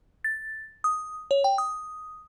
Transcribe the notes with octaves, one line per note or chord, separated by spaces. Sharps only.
A6
D#6
C#5
G5
D#6